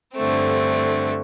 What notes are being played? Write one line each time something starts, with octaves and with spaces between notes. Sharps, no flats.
G2 D3 A3 C4